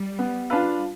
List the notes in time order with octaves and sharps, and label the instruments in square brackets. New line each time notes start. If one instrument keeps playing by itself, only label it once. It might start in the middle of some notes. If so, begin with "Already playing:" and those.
Already playing: [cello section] G3
[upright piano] B3
D4 F4 B4 F5